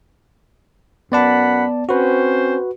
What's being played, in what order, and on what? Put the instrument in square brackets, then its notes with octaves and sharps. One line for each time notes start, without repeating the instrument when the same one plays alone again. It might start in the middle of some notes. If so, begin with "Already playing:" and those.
[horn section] F#2 F#5 B5 [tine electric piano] B3 D5 A5
[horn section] C4 C#4 C5 [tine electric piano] F#4 B4